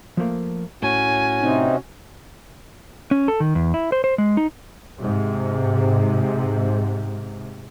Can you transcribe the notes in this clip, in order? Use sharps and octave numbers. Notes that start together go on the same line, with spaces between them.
F3 A3 A#3
A2 C#4 F#4 G#5
C3 C4 D#4
C#4
A4
D#3
E2
E4
C5
C5
G#3
D#4
G#2 C3